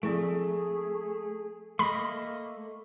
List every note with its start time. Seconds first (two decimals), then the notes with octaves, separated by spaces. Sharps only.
0.03 F3 A3 C4 E4 G#4
1.79 A3 A#3 D#5 B5